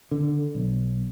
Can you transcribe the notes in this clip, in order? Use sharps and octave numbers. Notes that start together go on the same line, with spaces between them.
D3
B1